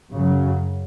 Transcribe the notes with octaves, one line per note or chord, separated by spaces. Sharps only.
F#2 C#3 F#3